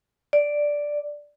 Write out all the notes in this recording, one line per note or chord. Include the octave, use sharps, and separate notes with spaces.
D5